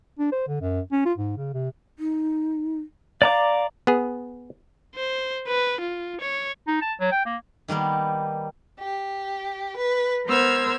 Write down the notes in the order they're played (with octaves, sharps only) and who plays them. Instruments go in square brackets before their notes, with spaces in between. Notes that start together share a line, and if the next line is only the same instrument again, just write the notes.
[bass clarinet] D4
C5
D3
F#2
C#4
F4
G#2
C#3
C3
[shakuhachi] D#4
[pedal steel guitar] D5 A#5 D6 [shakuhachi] F5
[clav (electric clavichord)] B3 G#4
[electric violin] C5
B4
F4
C#5
[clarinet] D#4
A5
F#3
G5
A#3
[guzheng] D#3 G3 A#3 B3
[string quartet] G4
B4
B3 A#4 C5 E6 F6 G#6